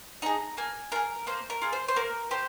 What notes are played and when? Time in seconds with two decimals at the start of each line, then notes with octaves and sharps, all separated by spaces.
0.22 D#4 G#4 A#5
0.57 A#3 G#5
0.92 F4 A#4
0.96 G#4
1.27 A#3 C5
1.50 A#4
1.62 F4 G#4
1.73 C5
1.88 C5
1.96 A#3 A#4
2.31 G4 C5